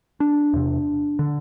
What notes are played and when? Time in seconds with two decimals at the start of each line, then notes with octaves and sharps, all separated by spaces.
0.20 D4
0.53 E2 C3
1.19 D3